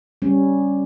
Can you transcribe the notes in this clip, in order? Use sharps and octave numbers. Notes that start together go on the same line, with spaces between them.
G3 C#4